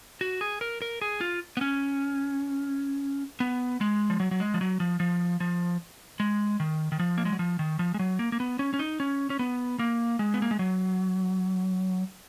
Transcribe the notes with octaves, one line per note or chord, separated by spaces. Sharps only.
F#4
G#4
A#4
A#4
G#4
F4
B3
C#4
B3
G#3
F3
F#3
F#3
G#3
F3
F#3
F3
F3
F3
G#3
D#3
D#3
F3
A#3
G#3
F#3
F3
D#3
F3
G#3
F#3
A#3
A#3
B3
C#4
C#4
D#4
C#4
C#4
B3
A#3
G#3
B3
A#3
G#3
F#3